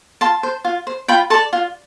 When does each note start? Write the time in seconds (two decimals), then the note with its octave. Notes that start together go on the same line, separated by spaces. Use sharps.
0.21 F4 A5 C6
0.43 C5
0.65 F4
0.87 C5
1.08 F4 G5 B5
1.30 A4 A5 C6
1.34 D5
1.53 F4